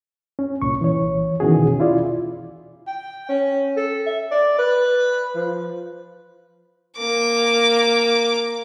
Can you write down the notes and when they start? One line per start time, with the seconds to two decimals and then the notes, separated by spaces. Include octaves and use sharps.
0.39 C#4
0.62 C2 A#2 C#6
0.81 E3 C#5
1.40 B2 D#3 E3 C#4 F#4 G#4
1.80 E4 F4 D5
2.87 G5
3.29 C#4
3.77 A4
4.06 E5
4.31 D5
4.59 B4
5.35 F3
6.98 A#3 D6